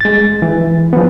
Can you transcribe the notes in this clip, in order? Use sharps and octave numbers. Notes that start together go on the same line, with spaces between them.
G#3 A6
E3
F3 B3